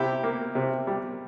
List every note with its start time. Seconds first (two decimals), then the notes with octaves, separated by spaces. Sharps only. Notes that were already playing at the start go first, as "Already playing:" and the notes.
Already playing: C3 E4 G4
0.23 A#3
0.55 C3
0.87 G3